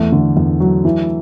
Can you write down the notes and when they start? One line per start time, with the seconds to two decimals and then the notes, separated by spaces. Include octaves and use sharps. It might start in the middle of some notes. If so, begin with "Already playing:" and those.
Already playing: E2 A3
0.12 D3
0.37 E2
0.60 F#3
0.85 E3